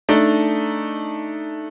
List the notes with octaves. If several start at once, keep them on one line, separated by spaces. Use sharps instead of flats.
A3 D4 D#4